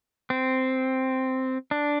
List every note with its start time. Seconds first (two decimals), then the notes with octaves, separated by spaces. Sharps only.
0.30 C4
1.71 D4